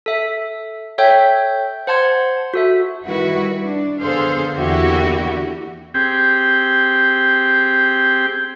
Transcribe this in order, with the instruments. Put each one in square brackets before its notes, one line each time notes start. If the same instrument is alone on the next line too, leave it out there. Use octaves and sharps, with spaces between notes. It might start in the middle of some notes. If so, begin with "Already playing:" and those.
[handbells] A4 E5
A4 C#5 E5 G5 G6
C5 F#5 A5 C6 G#6
F#4 A4 E5
[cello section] D#3 G3 E4 F#4 B4
D4
D3 B3 G#4 A4 C5 F5
E2 D3 A#3 E4 F#4 G4
[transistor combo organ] C4 G4 G#4 G5